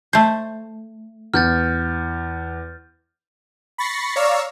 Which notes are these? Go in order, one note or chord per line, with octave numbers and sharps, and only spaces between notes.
A3 C5
E2 F6 G6 A6
B5 C#6 A6 A#6 C7 C#7
C#5 D5 F5 A#5 C#6 E6